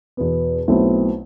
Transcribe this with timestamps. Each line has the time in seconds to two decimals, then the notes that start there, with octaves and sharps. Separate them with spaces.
0.17 E2 B2 B3
0.68 B1 B2 A3 C4 E4